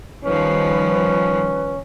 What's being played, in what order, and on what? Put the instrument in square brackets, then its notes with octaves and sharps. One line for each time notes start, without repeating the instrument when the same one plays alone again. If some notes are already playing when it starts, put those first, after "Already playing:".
[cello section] D#3 F3 G3 [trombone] C#4 [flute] B4